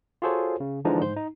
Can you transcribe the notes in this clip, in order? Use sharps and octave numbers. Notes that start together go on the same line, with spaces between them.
F4 F#4 G#4 A4 C5 C#5
C#3
D3 E3 F3 G#3 D4 D#4
G#2 C5 G6
D#4